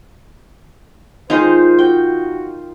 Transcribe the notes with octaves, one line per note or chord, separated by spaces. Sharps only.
D#3 G#3 D#4 F4 C5
F#4 G5